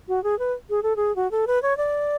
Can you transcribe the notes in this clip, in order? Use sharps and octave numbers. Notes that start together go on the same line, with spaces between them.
F#4
G#4
B4
G#4
A4
G#4
F#4
A4
B4
C#5
D5